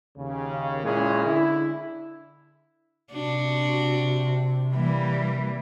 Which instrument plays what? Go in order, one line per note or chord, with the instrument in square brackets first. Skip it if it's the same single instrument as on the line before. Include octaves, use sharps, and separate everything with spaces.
[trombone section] D#2 C#3
A#2 G#3 C#4 E4 G#4
D3 E4
[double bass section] C3 [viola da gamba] D4 F#4
[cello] E3 G3 [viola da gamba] A#3